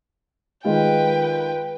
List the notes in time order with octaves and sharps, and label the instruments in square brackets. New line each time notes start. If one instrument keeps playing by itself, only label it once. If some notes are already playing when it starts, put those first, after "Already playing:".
[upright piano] D#3 G#3 F4 [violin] B4 G5